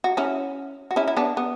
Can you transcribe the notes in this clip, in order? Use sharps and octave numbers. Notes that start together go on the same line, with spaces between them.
F#4
C#4 E4
F#4
C#4 E4
E4
B3 D4
B3